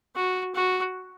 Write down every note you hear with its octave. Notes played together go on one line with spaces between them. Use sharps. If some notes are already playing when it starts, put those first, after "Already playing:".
F#4
F#4